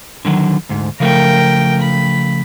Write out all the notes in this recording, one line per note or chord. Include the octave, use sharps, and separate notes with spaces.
D3 D#3 F#3
D2 G#2
C#3 F3 A3 A#4 G5
B5